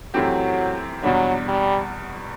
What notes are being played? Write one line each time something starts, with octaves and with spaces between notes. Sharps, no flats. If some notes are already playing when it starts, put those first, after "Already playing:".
F#2 E3 F#3 A3 C4 G4
E2 B2 F#3 G3 D4
G3